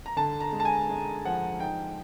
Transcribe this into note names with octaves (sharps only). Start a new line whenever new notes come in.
A#5
D3 A5
A#5
G#3
A5
G#5
G#3
F3 F#5
D#4 G5